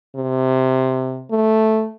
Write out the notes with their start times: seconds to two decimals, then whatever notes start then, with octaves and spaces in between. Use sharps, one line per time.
0.16 C3
1.31 A3